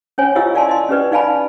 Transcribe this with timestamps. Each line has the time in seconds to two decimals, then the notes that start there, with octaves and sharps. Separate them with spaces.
0.18 C#4 C5 C#5 G#5
0.35 E4 F4 G4 D#5 F5 E6
0.54 A#4 D5 F5 G#5 A5 C6
0.69 D#5 C6
0.89 C#4 G4 B4 D5
1.12 D#4 D5 F5 G#5 A5 B5